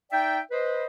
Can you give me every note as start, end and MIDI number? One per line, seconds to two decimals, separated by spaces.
0.11 0.39 63
0.11 0.39 74
0.11 0.39 76
0.11 0.39 79
0.51 0.85 71
0.51 0.85 72
0.51 0.85 75